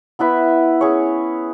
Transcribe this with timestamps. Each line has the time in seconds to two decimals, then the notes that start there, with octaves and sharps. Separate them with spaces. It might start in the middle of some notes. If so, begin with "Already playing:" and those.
0.19 B3 E4 B4 E5
0.81 C#4 G#4 C#5